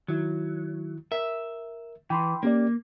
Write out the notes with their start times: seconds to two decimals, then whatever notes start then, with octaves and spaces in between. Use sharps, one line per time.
0.08 D#3 F#3 E4
1.12 A#4 E5
2.10 E3 G5 B5 C6
2.43 A#3 C#4 G4 D5